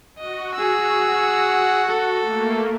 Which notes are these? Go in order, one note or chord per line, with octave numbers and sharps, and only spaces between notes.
F#4 D#5
G#4 E6
F#5
A4
A3 A#3